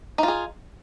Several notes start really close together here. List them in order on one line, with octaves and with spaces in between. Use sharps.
D#4 F4 G#4